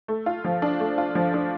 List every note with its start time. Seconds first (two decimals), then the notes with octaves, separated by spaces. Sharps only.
0.08 A3
0.26 F4
0.44 F3
0.62 D4
0.80 A3
0.98 F4
1.15 F3
1.34 D4